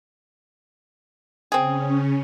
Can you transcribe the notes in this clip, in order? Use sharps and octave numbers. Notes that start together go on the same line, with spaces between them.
C#3 C4 C#4 G#4